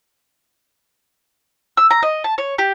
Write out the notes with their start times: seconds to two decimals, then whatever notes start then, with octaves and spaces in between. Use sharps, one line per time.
1.77 E6
1.90 A#5
2.03 D#5
2.24 A5
2.38 C#5
2.58 G4